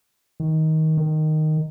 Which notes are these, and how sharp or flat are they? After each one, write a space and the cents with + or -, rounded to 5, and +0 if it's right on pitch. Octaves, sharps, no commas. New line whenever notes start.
D#3 +20
D#3 -5